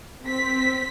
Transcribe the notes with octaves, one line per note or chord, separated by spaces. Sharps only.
C4 B6